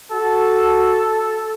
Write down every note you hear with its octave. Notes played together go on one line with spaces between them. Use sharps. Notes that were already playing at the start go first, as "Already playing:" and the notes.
F#4 A4